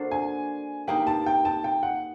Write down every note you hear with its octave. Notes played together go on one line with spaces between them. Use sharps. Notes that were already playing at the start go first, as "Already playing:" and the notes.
Already playing: A#3 D4 F#4 A4 C5
G#5
A#3 D#4 G4 B4 G5
A5
G5
A5
G5
F#5